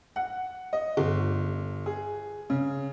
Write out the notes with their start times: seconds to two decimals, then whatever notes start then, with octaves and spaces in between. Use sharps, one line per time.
0.16 F#5
0.73 D#5
0.97 G1
1.86 G#4
2.50 C#3